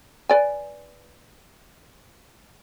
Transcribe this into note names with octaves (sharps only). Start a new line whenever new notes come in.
B4 D5 G#5